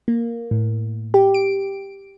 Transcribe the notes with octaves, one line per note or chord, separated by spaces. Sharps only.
A#3
A2
G4
D7